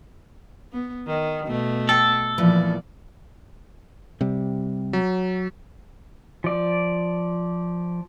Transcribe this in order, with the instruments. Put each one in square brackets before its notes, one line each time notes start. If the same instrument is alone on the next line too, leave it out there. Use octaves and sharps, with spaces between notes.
[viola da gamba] B3
D#3
B2 A3
[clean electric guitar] A4 [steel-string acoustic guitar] G5
[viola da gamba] A#2 D5 [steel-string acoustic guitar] E3 F3 B3
[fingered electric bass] C3 G3
[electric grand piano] F#3
[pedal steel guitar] F3 D5